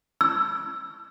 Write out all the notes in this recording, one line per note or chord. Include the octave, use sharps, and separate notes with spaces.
E6